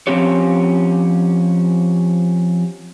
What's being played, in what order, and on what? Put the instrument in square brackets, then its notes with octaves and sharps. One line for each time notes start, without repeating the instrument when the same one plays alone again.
[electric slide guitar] F3 C4 C#4 G4 C#5